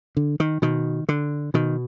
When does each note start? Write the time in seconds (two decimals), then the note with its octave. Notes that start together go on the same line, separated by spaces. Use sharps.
0.17 D3
0.40 D#3
0.62 B2 D#3
1.09 D3
1.54 B2 D#3